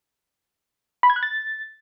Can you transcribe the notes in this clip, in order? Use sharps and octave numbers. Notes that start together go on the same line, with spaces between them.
B5
G#6
F#6
A6